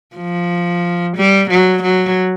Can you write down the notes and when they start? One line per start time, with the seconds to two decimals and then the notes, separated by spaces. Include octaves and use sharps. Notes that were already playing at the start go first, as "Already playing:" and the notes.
0.16 F3
1.17 G3
1.50 F#3
1.83 F#3